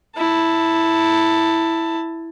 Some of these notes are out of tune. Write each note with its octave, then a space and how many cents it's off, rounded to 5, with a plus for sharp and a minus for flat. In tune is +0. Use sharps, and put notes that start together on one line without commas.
E4 +0 A5 +10